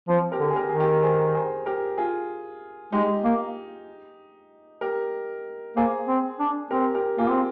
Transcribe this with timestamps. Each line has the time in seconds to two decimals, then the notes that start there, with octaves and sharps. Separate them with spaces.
0.08 F3 C4
0.32 G4 A#4
0.40 D3
0.50 G#4
0.56 G4 A#4
0.69 D#3 G#4
0.80 G4 A#4
1.03 G#4 C5
1.35 G#4 C5
1.66 G4 A#4
1.98 F4 G#4
2.92 G#3 D#4 G4
3.24 A#3
4.81 G4 A#4
5.76 A#3 G#4 C5
6.08 C4
6.39 D4
6.71 C4 G4 A#4
6.95 G4 A#4
7.18 A#3 F4 G#4
7.29 C4